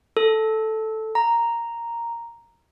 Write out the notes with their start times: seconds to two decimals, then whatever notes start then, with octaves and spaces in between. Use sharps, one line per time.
0.17 A4
1.15 A#5